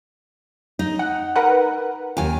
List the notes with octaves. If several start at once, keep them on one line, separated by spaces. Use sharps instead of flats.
D#4
F#5
A#4 B4 F#5
D#2 G#5